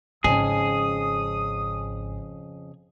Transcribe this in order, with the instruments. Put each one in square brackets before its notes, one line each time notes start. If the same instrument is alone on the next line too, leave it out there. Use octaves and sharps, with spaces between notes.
[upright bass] G#1 [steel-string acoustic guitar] F2 C#3 [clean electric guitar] G#4 [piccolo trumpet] D#6